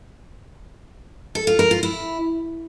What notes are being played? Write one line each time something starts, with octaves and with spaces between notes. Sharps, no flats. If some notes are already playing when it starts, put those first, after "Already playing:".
A4
F4
A#4
F4
E4